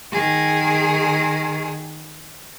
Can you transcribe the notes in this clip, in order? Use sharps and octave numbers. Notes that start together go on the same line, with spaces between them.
D#3 G#4